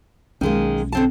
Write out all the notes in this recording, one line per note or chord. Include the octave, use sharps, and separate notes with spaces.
B1 D#3 G#3 A#3 C#4
D3 C4 A5